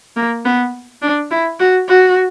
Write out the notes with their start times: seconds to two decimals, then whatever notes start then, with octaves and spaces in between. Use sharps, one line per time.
0.16 A#3
0.45 B3
1.02 D4
1.31 E4
1.60 F#4
1.89 F#4